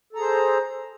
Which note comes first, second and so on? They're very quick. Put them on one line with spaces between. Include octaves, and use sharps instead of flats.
A4 A#5 G#4 C5